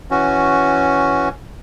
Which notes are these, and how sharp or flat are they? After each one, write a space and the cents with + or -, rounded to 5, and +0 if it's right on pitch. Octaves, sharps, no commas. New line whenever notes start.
E3 +0 C#4 +0 F#4 +0